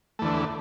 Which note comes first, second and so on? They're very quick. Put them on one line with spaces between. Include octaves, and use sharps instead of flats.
A3 E2 D3